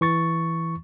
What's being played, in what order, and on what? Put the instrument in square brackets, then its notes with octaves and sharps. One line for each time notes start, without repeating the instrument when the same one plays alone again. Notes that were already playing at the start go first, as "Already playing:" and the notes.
[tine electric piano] E3 C#6 A6